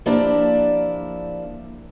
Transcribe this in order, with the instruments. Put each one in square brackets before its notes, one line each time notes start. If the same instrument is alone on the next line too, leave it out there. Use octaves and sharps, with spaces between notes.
[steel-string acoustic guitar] F3 A#3 D4 E4 G4 D5